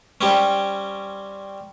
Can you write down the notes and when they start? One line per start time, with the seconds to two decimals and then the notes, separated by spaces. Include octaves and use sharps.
0.21 G3 C4 C#4